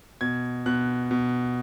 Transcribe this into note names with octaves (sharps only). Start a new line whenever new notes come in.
B2 G#6
B2 F#6
B2